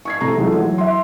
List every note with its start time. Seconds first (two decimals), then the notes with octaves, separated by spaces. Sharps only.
0.05 C#6 G#6 C7
0.21 C3 E3 A3 A#5
0.36 E3 F#3 G#3 A3 D#4 F4
0.54 E3 F#3
0.78 E5 C6